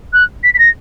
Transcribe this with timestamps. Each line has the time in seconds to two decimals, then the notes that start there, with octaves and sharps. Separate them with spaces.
0.13 F#6
0.44 B6
0.54 B6
0.59 A#6